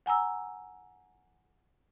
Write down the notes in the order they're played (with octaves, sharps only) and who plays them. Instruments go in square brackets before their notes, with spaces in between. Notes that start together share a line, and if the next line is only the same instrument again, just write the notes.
[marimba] F#5 G#5 A#5 E6